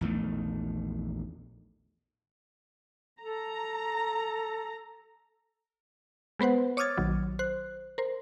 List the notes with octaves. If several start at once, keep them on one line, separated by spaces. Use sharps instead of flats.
A#1 E2 D#3 A3
A4 A#5
G#3 B3 B4 C5 F#5
C#5 D6 D#6 F6 G#6 A6
A#1 D#3 F#3
C5 F#6
A#4 C5